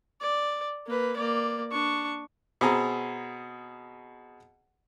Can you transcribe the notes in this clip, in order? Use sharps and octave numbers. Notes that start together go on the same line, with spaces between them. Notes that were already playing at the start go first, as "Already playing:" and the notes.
D5
A#3 B4
A#3 D5
D4 C#6
B2 C4 G#4 A#5